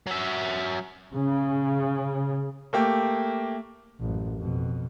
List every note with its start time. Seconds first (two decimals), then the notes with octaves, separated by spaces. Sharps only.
0.07 F#3 E5
1.13 C#3
2.73 A3 A#3 G4
4.00 A1 F#2
4.39 F2 B2